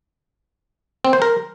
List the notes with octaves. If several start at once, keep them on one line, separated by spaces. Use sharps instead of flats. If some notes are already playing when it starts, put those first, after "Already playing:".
C4
C5
A#4